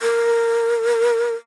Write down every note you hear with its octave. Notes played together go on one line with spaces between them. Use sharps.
A#4